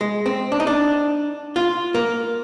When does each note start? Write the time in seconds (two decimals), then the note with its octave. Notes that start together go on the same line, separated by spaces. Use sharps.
0.01 G#3
0.26 C4
0.52 D4
0.60 D#4
0.67 D4
1.56 F4
1.94 A#3